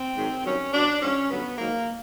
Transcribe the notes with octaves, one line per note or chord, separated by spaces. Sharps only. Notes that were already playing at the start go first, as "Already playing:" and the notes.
Already playing: C4
G#2 D#3 F#3
G2 D#3 F#3 C#4
B2 F#3 D4
G#2 F3 C#4
G2 D3 F#3 B3
G#2 D#3 F#3 A#3